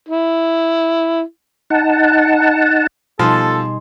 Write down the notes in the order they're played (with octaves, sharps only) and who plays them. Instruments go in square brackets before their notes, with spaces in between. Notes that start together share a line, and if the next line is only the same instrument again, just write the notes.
[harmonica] E4
[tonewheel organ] D#4 F#5 A5
[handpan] B2 G3 D#4 [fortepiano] F3 [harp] G#4 C6 [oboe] A4